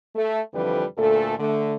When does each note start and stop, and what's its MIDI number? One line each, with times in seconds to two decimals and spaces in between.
0.16 0.41 57
0.54 0.84 41
0.54 0.84 50
0.54 0.84 52
0.54 0.84 53
0.54 0.84 55
0.54 0.84 71
0.98 1.36 38
0.98 1.36 46
0.98 1.36 57
0.98 1.36 69
1.39 1.76 50
1.39 1.76 57